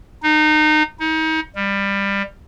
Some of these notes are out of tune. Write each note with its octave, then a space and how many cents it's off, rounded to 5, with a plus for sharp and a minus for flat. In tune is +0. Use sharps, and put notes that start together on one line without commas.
D#4 -25
D#4 +35
G3 +20